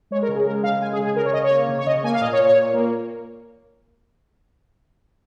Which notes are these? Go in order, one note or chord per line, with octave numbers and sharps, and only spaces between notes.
G#3 C#5
A#4
C#3
G#4
G#3 A#4
C#3 F5
G#3 G#5
G#4
C#3
G#4
C#3 A#4
C#5
C#3 D#5
C#5
A#3
C#3
C#5
C#3 D#5
A#3 G#5
F5
A#2 D#5
C#5
A#2
C#5
A#2
A#3